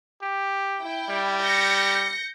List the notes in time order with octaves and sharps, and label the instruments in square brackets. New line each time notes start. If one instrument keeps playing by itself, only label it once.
[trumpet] G4
[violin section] E4 G5
[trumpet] G3
[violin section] G6 A#6 C#7